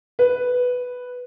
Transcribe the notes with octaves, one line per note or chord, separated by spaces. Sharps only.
B4